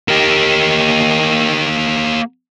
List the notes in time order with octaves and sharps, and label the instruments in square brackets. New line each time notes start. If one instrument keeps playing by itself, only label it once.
[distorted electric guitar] A#3 G4